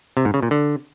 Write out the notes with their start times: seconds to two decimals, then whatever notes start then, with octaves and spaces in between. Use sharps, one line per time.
0.17 C3
0.25 G#2
0.34 C#3
0.42 A#2
0.51 D3